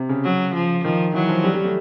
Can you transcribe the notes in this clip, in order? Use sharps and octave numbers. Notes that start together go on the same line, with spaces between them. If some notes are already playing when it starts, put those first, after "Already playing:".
Already playing: C3
C#3
F#3
F3
D#3 F3
E3 F#3
F3
G3
G3
A3